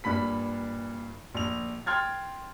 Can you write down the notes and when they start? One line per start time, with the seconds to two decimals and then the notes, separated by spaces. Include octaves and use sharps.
0.04 G2 A#2 B5 B6
1.34 A#1 F7
1.86 G5 C6 F6 G#6 A6